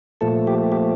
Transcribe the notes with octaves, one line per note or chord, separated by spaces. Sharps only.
A#2 F3 A3 A4
G4
G4